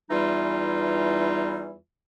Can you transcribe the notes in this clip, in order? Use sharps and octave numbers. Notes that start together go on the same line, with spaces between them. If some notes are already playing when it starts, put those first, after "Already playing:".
E2 E3 G3 D#4 F4